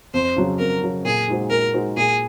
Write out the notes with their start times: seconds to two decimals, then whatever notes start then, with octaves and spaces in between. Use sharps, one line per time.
0.14 F2 C5
0.36 C#3 F#3
0.59 F2 A#4
0.82 C#3 F#3
1.05 A#2 G#4
1.28 G#3 D#4 F#4 C5
1.50 A#2 A#4
1.74 G#3 D#4 F#4 C5
1.97 A#2 G#4